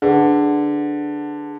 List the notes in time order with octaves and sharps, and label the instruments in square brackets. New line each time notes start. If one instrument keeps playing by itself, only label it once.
[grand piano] D3 [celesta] G#4 B4 F#5